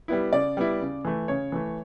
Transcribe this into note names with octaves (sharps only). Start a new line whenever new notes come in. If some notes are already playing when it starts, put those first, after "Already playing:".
G3 B3 E4
C#3 D5
G3 B3 E4
C#3
E3 A3
C#3 C#5
E3 A3